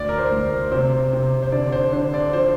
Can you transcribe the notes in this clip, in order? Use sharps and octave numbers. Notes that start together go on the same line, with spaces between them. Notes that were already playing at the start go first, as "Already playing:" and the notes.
Already playing: D2 D5
A#4
C5
D2
A#4
C3 C5
C3
C5
D3 D5
C5
D3 C5
D5
F3 C5